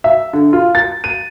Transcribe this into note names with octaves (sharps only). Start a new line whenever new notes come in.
E5
D3
F4
A6
D#7